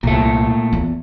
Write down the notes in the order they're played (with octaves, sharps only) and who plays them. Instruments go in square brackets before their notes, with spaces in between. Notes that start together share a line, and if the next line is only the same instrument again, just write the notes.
[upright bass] C2 [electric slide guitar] A#2 A3
[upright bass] E2